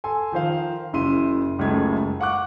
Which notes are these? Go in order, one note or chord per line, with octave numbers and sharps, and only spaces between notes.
A4 G#5 C6
D#3 F3 C5 F5
F#1 C#3 E4 C6 D#7
F#1 C#2 C#3 A3 D#4 G#6
F5 F#5 C#6 D6 F#6